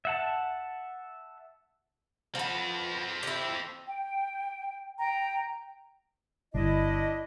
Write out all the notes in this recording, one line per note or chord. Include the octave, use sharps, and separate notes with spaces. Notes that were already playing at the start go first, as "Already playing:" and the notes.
E5 F#5 A5
F3 B3 C4 A4
E4 G4
G5
G5 A#5
G1 D4 E4 D#5